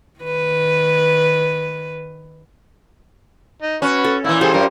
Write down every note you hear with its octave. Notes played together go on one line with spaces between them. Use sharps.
D#3 B4
D#4
C#4 F#4 B4
A4
A#2 E3 E4
G3 G#4 A4 C5
F#2 F4 A#4 C5